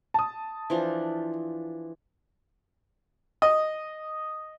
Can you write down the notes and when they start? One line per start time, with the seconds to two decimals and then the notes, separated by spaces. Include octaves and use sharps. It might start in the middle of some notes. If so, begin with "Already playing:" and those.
0.14 A5 D#6
0.70 E3 F3 D4
3.42 D#5